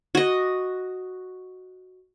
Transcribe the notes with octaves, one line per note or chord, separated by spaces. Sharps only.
F#4 D#5